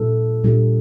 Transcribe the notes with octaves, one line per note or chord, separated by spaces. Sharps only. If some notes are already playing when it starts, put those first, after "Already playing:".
Already playing: A#2 G3 D4 F4 A4
A#2 G3 D4 F4 A4